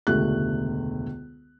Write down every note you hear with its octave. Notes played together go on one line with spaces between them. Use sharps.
E1 C#2 D3 A3 G4 F#6